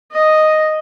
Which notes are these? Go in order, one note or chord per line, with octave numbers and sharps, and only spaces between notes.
D#5